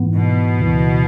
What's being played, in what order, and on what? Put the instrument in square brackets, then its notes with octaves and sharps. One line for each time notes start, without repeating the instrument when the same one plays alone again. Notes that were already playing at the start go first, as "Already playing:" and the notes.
Already playing: [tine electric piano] G#2 E3 B3
[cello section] B2
[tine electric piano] D2 C#3 E3